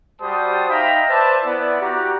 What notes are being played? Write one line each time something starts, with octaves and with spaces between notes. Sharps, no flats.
G3 F#4 G4 C5 A5 D#6
D#4 E5 F5 G5 A#5 B5
B4 C5 D5 E5 A5
B3 E4 D5
F#4 G4 D5 F#5 A#5